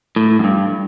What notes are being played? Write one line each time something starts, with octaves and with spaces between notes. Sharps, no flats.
A2
F#2
G2